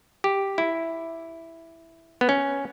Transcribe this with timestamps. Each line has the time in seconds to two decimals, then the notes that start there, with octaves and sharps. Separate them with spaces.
0.24 G4
0.58 E4
2.21 B3
2.29 C#4